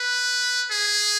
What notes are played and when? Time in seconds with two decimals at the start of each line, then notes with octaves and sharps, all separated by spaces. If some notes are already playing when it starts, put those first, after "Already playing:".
Already playing: B4
0.71 G#4